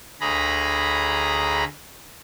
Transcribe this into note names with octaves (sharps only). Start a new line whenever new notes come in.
D2 G#4 A#5 B5